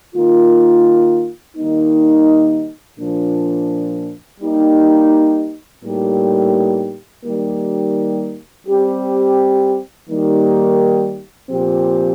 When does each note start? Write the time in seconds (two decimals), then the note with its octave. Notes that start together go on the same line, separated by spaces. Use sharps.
0.15 D#3 A#3 F4
1.57 D#3 G3 A#3 D#4
2.99 A#2 F3 A#3 D4
4.40 G3 A#3 D#4 G4
5.83 A2 G3 A#3 D#4 G4
7.24 D#3 G3 A#3 D#4 G4
8.67 G3 C4 G4
10.09 D#3 G3 A#3 D#4 G4
11.50 A#2 F3 C4 G4